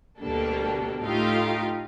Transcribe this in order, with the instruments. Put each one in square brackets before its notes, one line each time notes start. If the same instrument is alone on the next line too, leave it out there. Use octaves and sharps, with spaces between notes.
[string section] D2 B2 G3 A#3 D4 A4
A2 A3 D#4 F4 G4 F5